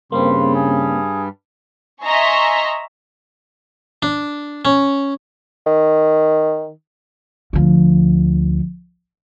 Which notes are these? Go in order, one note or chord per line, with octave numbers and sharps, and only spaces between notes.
G2 C#3 G3 A#3 C4 C6
G#4
D#5 E5 G#5 A#5 C6 C#6
D4
C#4
D#3
D2 F3